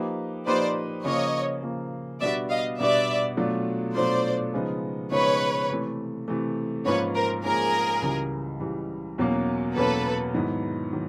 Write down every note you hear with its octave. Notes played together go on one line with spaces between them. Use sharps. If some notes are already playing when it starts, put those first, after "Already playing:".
Already playing: F3 A#3 D#4 G4 B4
F3 A#3 D#4 G4 B4 C5 D5
C#3 F3 A#3 C#5 D#5
C#3 F3 A#3
B2 G3 B3 D4 F#4 D5 E5
D#5 F5
B2 G3 B3 D4 F#4 D5 E5
B2 F#3 A3 D4 F4
B2 F#3 A3 D4 F4 C5 D5
C#3 F3 G#3 B3 D#4
C#3 F3 G#3 B3 D#4 B4 C#5
C3 E3 A3
C3 E3 A3
G#2 F3 A#3 C#4 F4 B4 C#5
A#4 C5
G#2 F3 A#3 C#4 F4 G#4 A#4
C#2 C#3 E3 G3
C#2 C#3 E3 G3
E2 B2 F#3 A#3 C#4
E2 B2 F#3 A#3 C#4 A4 B4
G#2 D#3 F#3 B3 E4
D#3 F#3